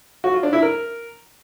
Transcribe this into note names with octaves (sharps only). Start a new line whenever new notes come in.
F#4
F4
D4
E4
A#4